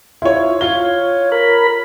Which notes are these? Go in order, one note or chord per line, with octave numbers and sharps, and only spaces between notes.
E4 F4 C#5
F4 C#5 G7
A#4 B5